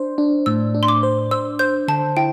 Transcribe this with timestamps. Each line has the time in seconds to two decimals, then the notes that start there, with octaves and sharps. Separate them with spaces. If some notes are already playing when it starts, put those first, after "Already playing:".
Already playing: D4 C5
0.18 D4
0.46 A2 E6
0.75 D4
0.83 C6
0.88 D6
1.03 C5
1.31 C5 E6
1.59 C5 G6
1.88 D3 A5
2.17 E4 G5